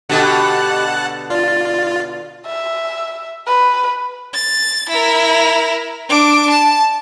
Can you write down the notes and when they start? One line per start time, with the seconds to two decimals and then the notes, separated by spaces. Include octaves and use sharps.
0.09 B2 D3 G4 F#5 A5 F#6
1.30 F4 D5
2.46 E5
3.47 B4
4.34 A6
4.89 E4 A#4
6.09 D4 D6
6.50 A5